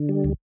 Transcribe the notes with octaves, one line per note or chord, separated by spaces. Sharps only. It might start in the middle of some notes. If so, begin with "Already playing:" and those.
Already playing: D3
G3
D2